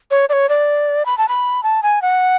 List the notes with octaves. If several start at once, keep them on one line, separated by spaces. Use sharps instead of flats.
C#5
D5
C#5
D5
B5
A5
B5
A5
G#5
F#5